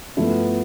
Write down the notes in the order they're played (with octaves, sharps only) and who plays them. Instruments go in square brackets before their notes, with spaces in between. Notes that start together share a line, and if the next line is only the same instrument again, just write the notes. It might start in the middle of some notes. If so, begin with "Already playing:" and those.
[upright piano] G2 F3 A3 E4 [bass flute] B3